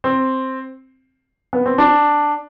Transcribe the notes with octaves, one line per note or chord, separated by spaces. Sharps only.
C4
B3
C4
D4